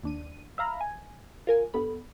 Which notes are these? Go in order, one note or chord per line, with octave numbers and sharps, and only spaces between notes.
D#2 D4 D#7
E5 F5 A#5 B5
G#5
F4 A#4 G#5
G2 B3 A4 B5